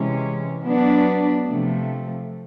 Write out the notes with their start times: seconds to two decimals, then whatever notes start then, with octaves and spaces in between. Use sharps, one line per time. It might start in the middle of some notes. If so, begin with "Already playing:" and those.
Already playing: C3 E3 G#3 C#4
0.63 F#3 B3 D4
1.45 C3 F3 A3